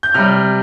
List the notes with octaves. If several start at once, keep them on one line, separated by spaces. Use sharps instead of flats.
G6
C3 G3 F6